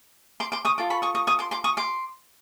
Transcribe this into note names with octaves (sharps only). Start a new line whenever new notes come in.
C6 D6
C6 D6
C#6 D#6
F4 A4 D6
B5 C#6
C#6 D#6
C#6 D#6
C#6 D#6
C6 D6
C6 D6
C#6 D#6
C6 D6